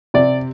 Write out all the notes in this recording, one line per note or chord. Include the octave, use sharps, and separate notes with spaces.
C3 D5